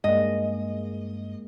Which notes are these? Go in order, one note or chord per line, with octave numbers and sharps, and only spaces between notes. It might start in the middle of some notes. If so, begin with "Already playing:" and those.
G2 G#3 A#3 D#5